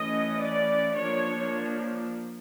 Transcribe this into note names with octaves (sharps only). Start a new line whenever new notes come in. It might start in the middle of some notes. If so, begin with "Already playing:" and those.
Already playing: E3 A3 C#4 D#5
D5
F3 A#3 D4 C#5